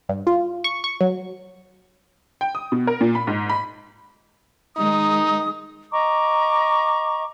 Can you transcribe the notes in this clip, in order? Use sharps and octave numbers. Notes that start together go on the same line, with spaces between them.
G2
F4
C#6
C#6
F#3
G5
D#6
B2
A#4
A#2
B5
G#2
B5
D#3 G#3 D#4 D#6
D#5 A#5 C#6 D6